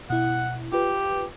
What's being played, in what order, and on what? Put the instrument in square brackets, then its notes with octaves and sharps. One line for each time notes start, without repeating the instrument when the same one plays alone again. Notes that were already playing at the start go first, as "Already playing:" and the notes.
[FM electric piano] B2 E4 [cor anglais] F#5
[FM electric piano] F4 B4 [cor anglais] G4